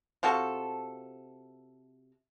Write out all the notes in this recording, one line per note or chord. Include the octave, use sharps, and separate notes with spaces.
C3 F4 F#4 A4